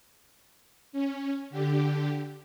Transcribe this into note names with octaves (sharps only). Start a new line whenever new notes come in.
C#4
D3 G4